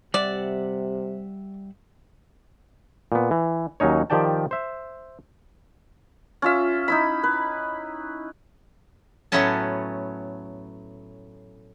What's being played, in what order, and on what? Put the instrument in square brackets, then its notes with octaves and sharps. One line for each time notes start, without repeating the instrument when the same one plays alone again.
[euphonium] C3 [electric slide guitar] G3 E5 F#5 [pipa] D5
[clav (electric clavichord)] A#2 B3
E3
D#2 F#3 C#4 D#4 C#5
D#3 F3 G4 D5 G5 A5
C5 E5
[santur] C#4 F4 E5
D#4 E4 B5
B4
[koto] A2 F#3 A3 B3 C#4 A5